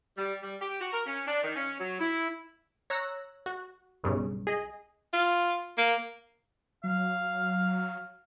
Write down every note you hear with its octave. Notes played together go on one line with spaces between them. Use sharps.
G3
G3
G4
F#4
A#4
C#4
D4
D#3
C#4
F#3
E4
C#5 A#5 E6 F#6 A#6
F#4
B1 G2 C#3
G#4 D#5
F4
A#3
F#3 F5